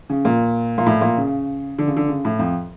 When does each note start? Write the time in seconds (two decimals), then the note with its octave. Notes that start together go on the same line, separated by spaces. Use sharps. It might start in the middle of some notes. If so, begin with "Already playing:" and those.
0.10 C#3
0.25 A#2
0.78 A#2
0.86 A2
1.01 A#2
1.18 C#3
1.78 D3
1.87 C#3
1.97 D3
2.08 C#3
2.25 A2
2.39 F2